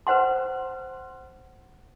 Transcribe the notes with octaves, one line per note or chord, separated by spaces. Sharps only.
B4 C5 F#5 C6